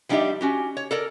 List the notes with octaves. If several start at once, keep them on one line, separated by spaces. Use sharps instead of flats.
F3 G3 D4 D#4 G4 E5
C#4 F#4 G4
C#5
A4 A#4 D5